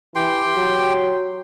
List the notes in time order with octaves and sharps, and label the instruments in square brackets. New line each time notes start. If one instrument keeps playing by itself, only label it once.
[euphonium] E3 [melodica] G4 G5 C6
[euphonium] F#3